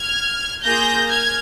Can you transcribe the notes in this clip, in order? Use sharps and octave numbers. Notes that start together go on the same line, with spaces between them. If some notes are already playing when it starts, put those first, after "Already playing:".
Already playing: F6 G#6
A#3 F4 G#4 G6 A#6
F6 G#6